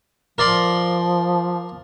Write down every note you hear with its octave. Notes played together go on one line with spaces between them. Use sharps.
F3 A#4 D5 C6